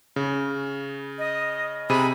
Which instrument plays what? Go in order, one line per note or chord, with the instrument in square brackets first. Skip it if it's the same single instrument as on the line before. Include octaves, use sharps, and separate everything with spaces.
[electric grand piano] C#3
[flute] D#5
[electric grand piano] C3 G#4 D#7 [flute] B5